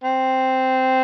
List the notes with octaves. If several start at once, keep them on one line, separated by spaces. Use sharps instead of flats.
C4